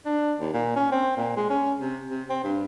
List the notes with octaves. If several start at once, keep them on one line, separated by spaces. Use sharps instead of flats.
D4
D#2
A#2
C#4
C4
A#2
G#3
C#4
C3
C3
C4
G2